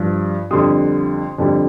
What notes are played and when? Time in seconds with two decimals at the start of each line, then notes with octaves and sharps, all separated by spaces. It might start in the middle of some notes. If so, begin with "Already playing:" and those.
Already playing: G2 F3
0.51 F2 D3 G3 C6 D#6
1.38 F2 D3 G3